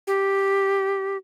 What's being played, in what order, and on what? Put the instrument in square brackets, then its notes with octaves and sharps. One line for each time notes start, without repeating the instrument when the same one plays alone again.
[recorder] G4